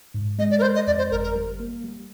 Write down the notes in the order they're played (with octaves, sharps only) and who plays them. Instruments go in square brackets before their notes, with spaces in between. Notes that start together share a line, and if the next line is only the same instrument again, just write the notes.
[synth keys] G#2
[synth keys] G#3 [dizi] D#5
[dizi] D5
A#4
[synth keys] G#3 [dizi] C5
[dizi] D#5
[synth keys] F2 [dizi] D5
[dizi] C5
[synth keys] G1 [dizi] A#4
[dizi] A#4
[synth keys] G3
A#3
G3